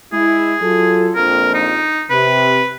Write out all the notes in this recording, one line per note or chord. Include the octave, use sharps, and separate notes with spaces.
G#3 E4 G#4
F#3 F4 A4
A#1 F2 A#4
D#4
C3 B4